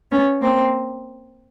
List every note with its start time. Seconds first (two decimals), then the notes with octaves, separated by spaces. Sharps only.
0.11 B3 C#4
0.41 A#3 C4